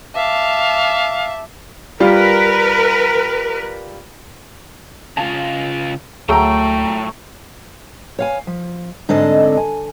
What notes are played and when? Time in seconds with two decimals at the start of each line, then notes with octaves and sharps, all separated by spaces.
0.15 E5 F5 A5 D6
2.00 G3 F4 A#4 B4
5.17 C#3 F4 A5
6.29 D2 A2 F#3 A3 G#4 G5 A#5
8.19 C#5 F5 G#5
8.47 F3
9.09 G#2 D3 C4 D4 A4 D#5
9.57 G#5